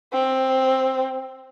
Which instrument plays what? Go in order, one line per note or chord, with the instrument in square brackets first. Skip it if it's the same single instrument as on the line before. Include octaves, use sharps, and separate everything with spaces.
[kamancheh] C4